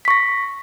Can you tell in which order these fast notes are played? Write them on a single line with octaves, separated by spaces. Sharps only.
B6 C#6 A#6